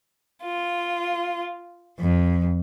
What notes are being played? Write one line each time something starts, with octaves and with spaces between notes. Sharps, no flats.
F4
F2